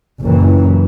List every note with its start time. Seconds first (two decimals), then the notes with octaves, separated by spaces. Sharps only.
0.20 F#1 A#2 E3